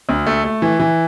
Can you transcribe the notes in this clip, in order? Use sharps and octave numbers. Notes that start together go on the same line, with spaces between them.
D2
A3
A3
E3
E3